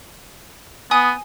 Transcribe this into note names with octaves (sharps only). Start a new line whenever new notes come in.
B3 G#5 D#6